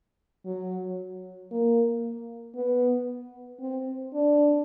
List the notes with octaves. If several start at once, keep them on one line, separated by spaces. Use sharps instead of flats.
F#3
A#3
B3
C4
D4